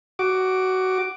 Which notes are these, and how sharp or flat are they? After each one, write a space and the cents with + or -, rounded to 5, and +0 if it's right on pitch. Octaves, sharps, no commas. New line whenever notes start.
F#4 +15 D6 +0